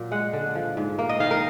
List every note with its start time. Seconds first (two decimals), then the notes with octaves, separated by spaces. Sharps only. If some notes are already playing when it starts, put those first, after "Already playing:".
Already playing: A#2 F#3
0.11 G#3 F#5
0.33 D3
0.55 F3
0.77 G#2
0.99 A#3
1.09 D#5
1.20 D#3 F5
1.31 A#4